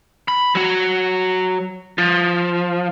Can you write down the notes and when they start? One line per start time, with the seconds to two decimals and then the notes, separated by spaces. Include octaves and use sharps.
0.28 B5
0.55 F#3 F#4
1.98 F3